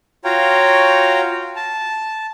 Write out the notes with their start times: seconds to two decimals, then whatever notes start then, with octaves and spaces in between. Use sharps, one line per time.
0.24 F4 F#4 C#5 F5 G5 A#5
1.56 A5